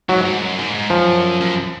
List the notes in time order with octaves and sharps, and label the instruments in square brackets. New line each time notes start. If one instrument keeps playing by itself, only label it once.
[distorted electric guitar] G#2 [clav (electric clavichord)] F#3
[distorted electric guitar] G#2
F#2
G#2
G#2
[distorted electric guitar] F#2 [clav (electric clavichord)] F3
[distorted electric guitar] F#2